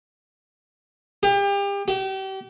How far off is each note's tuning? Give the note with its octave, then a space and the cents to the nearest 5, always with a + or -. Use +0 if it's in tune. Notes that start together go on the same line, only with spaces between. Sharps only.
G4 +35
G4 -35